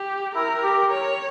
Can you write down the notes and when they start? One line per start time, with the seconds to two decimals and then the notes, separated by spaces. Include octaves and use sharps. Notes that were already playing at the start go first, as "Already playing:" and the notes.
Already playing: G4
0.35 E4 A#4
0.63 G4
0.91 C#5